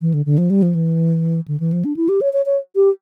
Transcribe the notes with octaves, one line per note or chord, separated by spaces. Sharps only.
E3
D3
D3
F3
G3
F3
E3
D3
E3
F3
D4
E4
G4
C#5
C#5
C#5
G4